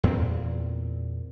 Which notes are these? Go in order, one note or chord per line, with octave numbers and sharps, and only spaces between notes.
E2 A#2 A#3 C4